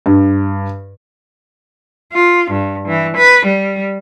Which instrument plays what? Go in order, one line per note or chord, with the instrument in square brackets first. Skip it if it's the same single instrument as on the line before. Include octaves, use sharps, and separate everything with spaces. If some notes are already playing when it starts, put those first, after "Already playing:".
[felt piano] G2
[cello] F4
G2
E3
B4
G3